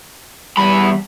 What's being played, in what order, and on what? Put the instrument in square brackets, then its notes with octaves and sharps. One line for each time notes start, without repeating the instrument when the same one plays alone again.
[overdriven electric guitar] E2 B5 [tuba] G3